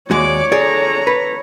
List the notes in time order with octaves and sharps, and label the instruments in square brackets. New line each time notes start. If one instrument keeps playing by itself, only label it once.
[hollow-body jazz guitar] D#2 G#3 F#4 [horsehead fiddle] C#5 [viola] D5 D6
[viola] D3 A#5 [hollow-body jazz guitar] G#4 D5
[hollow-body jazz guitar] B4